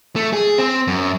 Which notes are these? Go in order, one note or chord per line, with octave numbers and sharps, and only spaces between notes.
A3
G#4
C4
F#2